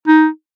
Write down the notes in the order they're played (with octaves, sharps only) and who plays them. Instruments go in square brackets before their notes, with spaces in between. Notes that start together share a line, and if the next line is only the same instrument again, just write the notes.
[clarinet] D#4